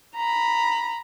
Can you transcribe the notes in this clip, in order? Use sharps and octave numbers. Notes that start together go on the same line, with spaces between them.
A#5 B5